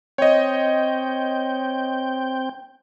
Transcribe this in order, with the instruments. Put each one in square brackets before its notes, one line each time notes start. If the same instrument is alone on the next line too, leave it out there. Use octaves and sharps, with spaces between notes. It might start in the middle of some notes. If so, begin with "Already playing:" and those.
[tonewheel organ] C4 G5 [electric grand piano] C#5 D#5